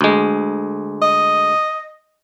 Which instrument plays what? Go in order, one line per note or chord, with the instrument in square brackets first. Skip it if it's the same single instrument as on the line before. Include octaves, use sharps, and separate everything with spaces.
[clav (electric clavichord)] D2 G#3
[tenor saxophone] D#5